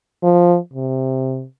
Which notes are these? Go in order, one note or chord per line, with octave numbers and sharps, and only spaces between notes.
F3
C3